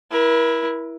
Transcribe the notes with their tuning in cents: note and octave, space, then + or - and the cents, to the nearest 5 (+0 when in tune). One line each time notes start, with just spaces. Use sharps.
E4 +0 A#4 +40